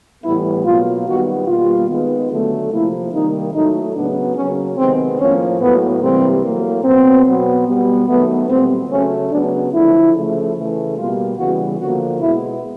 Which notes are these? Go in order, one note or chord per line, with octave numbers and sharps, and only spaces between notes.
A2 E3 G3 B3 E4
B2 F#3 A#3 F4
D#3 G3 B3 F#4
B2 G3 A#3 F4
D#3 G#3 B3
D3 F#3 A3
C3 F3 A#3 E4
C3 D#3 G3 A#3 D#4
A2 F#3 A3 D#4
C#3 F#3 B3 D4
C#3 F#3 A#3 C#4
C3 D#3 G#3 B3 C4
A2 F3 A#3 C#4
A2 F#3 A#3 B3
C3 E3 G3 A#3 C4
A2 F#3 A#3
B2 F#3 B3 C4
B2 F#3 B3
B2 G3 B3
D#3 F#3 A3 B3
A#2 G3 B3 C4
C#3 F#3 A3 C#4
C#3 F#3 B3 D4
D3 F3 A3 E4
C#3 F3 A3
C#3 E3 A3
B2 G3 A#3 F4
C#3 E3 G3 B3 F#4
D3 F3 A#3 F#4
B2 G#3 B3 E4